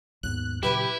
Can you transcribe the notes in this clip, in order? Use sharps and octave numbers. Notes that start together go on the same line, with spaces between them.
D#2 G#2 B3 F#6
A#2 C#3 F#3 E4 G4 B4